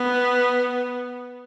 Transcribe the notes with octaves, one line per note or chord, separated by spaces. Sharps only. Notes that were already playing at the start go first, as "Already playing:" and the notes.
Already playing: B3